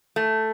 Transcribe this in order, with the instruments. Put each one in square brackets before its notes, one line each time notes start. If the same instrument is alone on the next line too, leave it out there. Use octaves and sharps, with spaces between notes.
[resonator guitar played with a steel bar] A3